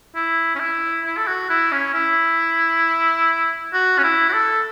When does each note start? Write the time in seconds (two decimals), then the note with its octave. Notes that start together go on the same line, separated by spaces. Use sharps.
0.15 E4
0.55 C#4
0.59 E4
1.05 E4
1.17 A4
1.27 F#4
1.50 E4
1.72 C#4
1.94 E4
3.73 F#4
3.99 C#4
4.03 E4
4.29 F#4
4.33 A4